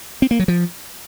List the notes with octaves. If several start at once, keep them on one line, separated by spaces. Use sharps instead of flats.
C4
A#3
F#3
F3